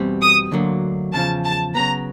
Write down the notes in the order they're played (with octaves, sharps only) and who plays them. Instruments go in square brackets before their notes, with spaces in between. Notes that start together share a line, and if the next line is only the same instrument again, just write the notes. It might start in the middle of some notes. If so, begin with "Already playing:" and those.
Already playing: [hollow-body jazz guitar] E2 B2 G3 C4
[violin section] D#6
[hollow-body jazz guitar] D2 D3 F#3 A#3
[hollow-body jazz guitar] E2 C#3 F3 [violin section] A5
[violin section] A5
[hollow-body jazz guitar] C#3 F#3 B3 [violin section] A#5